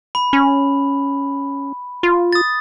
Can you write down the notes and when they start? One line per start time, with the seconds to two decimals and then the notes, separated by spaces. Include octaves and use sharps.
0.15 B5
0.33 C#4
2.03 F4
2.33 D#6 A6